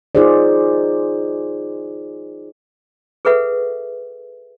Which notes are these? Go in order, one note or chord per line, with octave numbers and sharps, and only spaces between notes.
D#4 F4 G#4 C5 D5
G#4 A4 B4 E5 F#5